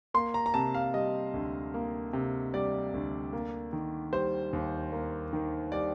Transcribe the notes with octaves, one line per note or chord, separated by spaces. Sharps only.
A#3 C6
A#5
A#5
C3 A5
F5
G3 D#5
D2
A#3
C3
G3 D5
D2
A#3
D#3
G3 C5
D#2
A#3
D#3
G3 D5